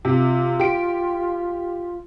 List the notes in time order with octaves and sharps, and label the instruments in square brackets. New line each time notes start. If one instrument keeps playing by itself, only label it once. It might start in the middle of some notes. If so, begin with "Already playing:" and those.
[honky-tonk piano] C3 [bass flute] F4
[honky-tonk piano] G4 D7